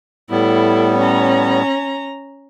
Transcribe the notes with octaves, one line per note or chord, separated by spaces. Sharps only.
A2 G3 B3 E4 A4
C#4 A#5